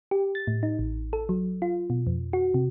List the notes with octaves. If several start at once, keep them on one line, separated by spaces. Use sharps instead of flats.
G4
A6
A2
D#4
A1
A4
F#3
F4
B2
F2
F#4
C3